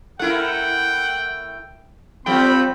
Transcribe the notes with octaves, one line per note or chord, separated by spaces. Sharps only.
A3 E4 A#4 F#5 G5
F3 G3 A3 C4 G5 B5